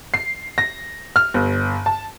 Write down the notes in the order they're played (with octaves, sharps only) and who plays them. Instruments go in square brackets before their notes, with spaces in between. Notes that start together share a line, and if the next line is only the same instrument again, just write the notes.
[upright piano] C7
A#6
F6
G1
A5